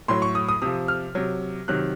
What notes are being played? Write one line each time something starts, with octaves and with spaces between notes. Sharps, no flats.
A2 F#3 C6
C#6
D#6
D#6
C3 F3 D#6
F6
C3 F#3
C3 D#3 F#3 F#6